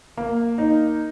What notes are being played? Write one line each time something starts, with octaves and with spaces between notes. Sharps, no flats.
A#3
D#4